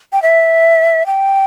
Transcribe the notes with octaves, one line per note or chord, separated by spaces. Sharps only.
G5
E5
G5